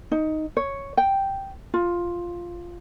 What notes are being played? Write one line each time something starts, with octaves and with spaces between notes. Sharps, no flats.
D#4
C#5
G5
F4